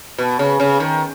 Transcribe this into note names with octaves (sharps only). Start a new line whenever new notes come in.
B2
C#3
C#3
D#3